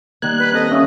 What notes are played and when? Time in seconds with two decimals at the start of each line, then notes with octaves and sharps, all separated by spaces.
0.22 D#3 G3 A#3 F#6 G#6
0.39 B4
0.54 C4 A4 D#5
0.72 C#4 E5 F5 D#6